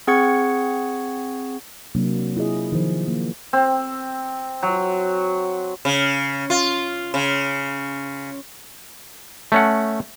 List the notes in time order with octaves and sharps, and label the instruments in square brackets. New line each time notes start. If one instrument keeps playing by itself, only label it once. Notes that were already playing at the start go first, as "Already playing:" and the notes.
[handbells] C4 G#4 F#5 C#6 G#6 C#7
[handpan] C3 F#3 A#3 D4
E4 F4 G#4 D#5
D#3 F3
A#3
[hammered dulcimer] C4
F#3
[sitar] C#3
F4
C#3
[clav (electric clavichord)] A3 C#4 F#5